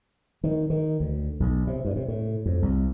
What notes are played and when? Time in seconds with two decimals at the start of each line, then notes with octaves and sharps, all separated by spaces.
0.44 D#3
0.70 D#3
1.00 D2
1.40 B1
1.67 C3
1.85 G2
1.96 C3
2.08 A2
2.46 F2
2.62 C2